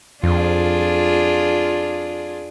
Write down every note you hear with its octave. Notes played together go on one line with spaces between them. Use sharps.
F2 D4 F4 G#4